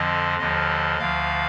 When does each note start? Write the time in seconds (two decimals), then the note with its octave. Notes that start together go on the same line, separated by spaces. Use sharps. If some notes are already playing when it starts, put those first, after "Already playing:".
Already playing: F2 D3 F3 D#5
0.39 D#2 D3 F3 D#5
0.99 D2 D3 F3 F5